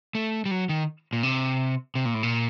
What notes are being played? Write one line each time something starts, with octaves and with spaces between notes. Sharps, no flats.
A3
G3
F#3
D#3
A#2
C3
C3
A#2
A2
A#2